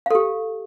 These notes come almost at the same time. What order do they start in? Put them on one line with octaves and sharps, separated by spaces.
F5 A4 G4